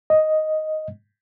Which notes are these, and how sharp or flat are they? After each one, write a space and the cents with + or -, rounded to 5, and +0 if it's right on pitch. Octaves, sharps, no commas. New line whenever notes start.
D#5 +5